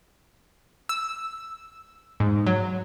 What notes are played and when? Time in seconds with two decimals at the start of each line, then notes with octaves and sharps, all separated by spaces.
0.89 E6
2.20 G#2
2.47 F#3